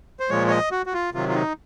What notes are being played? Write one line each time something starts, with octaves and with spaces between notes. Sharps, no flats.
C5
A#2 F3 G#3 C#5
C#5
D#5
F#4
F#4
F4
C3 D#3 F#3 F4
F4
D#4